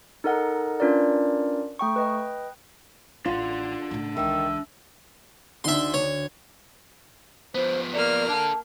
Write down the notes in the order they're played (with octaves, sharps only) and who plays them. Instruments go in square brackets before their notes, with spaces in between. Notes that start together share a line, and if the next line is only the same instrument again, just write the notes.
[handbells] D#4 A4 A#4 D#5 F#5
C#4 D4 F4 A#4 B4 D5
A3 G5 C#6
B4 D#5 G5
[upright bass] A1 [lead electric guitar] D4 F#5 [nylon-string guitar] F4
[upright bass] A2 C#3
[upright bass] C#2 E3 [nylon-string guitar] D#3 [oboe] E5
[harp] D2 [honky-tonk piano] D4 D#4 [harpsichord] E5 C6
[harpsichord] C#5
[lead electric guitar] F3 B3 [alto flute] C5
[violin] A#3 F6 [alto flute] D5
[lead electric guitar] D4 A4 [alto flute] A5